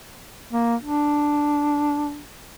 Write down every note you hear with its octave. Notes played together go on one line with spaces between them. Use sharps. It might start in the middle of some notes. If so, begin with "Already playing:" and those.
A#3
D4